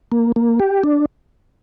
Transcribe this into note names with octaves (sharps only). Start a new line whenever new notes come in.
A#3
A#3
G4
D4